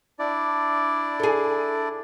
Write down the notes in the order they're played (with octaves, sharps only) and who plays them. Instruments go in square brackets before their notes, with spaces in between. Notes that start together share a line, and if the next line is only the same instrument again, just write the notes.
[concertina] D4 E4 D5
[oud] G#4 A4